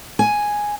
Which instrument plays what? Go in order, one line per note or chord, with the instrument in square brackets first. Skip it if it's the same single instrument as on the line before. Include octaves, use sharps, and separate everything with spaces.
[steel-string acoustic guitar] G#5